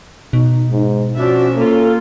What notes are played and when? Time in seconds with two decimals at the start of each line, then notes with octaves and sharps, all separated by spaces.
0.33 B2 D#4
0.70 G#2
1.17 F3 C#4 D4 F#4 E5
1.57 A#3 F4 A4